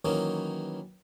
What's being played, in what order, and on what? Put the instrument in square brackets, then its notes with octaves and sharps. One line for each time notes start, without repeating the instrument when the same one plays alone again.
[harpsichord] D#3 E3 F#3 A#3 C#4 D#4